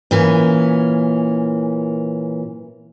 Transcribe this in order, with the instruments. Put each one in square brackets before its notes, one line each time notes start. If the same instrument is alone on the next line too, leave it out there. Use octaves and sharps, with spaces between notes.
[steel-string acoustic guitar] A#2 E3 C#4